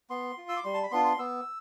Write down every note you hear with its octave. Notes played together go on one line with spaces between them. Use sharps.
B3 C6
F4
E6
D6
G3 C6
A5
B5
B3 D4 F4 C6
C6
B3 E6